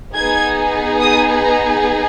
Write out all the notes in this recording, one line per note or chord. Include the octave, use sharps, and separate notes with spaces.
B3 D#4 G#4 G#6
D#6
A#5